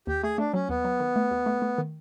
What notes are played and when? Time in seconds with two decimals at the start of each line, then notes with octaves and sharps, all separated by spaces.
0.07 D#2 G4
0.23 A3 G#4
0.38 A3 D4
0.54 F#3 C#4
0.69 D#2 B3
0.84 F#3
1.00 D#3
1.16 A3
1.31 D#2
1.46 A3
1.62 A3
1.78 D#3